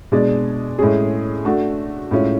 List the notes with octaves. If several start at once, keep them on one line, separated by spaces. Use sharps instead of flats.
B2 G#3 D4 G#4 D5
A2 G#3 C#4 G#4
A3 D4 F#4
A2 G#3 C#4 F4